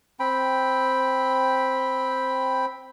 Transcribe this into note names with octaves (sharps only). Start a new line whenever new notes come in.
C4 G5 B5